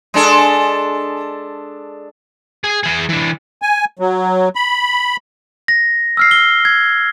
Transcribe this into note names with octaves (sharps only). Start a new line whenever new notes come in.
G#3 D4 A4
G#4 G#5
E3 G#4
E3 D4
G#5
F#3
B5
A#6
E6 F6 C7
G7
G#6